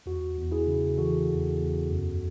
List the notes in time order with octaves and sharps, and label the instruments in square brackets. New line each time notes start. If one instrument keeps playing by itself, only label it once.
[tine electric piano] E2 F#4
E2
E4 G#4
C#3
E3 F#4 A4
E2
E2
F#2